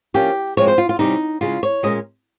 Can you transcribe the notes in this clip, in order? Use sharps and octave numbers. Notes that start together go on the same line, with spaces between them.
F3 A#3 C#4 G4
F3 G#3 C4 C#5
C5
F4
F4
C3 G3 C#4 D#4
C#3 G#3 C#4 F4
C#5
A#2 G#3 C#4 D#5